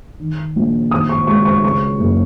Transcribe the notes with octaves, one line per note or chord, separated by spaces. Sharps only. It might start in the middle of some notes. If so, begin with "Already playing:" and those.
D#3
A#1
D#3 D#6
C#6
C#2 C#6
C#6
C#3 C#6
F#1